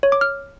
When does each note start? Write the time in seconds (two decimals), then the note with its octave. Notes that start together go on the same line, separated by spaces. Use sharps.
0.03 C#5
0.12 D6
0.21 F6